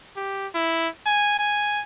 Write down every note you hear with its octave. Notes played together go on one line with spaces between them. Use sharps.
G4
E4
G#5
G#5